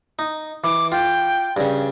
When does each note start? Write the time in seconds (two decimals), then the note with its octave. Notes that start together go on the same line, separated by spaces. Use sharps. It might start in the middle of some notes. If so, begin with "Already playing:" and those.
0.19 D#4
0.64 E3 D6
0.92 F4 G5
1.57 G2 C#3